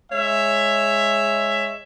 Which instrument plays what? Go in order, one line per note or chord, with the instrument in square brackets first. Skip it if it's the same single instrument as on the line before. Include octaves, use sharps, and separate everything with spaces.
[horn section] G#3 C#5 E5